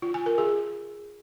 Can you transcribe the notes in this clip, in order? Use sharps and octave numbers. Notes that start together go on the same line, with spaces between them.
F4
G#5
A#4
G#4